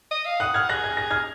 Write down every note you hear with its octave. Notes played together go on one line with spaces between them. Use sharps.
D#5
F5
F#5 D#6 F#6
F6 G#6
G#4 F#6 A#6
G#6
A#6
F6 G#6